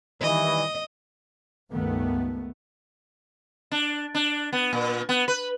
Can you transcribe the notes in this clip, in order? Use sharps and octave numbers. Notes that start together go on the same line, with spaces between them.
D#3 E3 G3 D#5
C#2 G2 D#3 A3 B3
D4
D4
B3
A#2
B3
B4